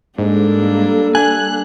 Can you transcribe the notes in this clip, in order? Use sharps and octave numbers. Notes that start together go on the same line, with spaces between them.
G#2 G3 A#3 D4 A4
D4 G#5 F#6